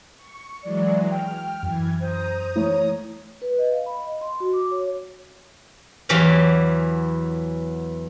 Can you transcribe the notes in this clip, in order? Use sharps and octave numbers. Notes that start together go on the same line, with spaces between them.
C#6
E3 F#3 G#3 D5
G5 F6
F#2 E3 G#6
C5 A#5 D#6
E3 A3 E4 C#5
B4
D#5
F5
B5
D#5
C6
F#4
D6
C#5
E2 E3 F#3 G4 F5